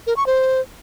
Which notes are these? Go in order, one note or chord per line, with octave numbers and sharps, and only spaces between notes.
A#4
C#6
C5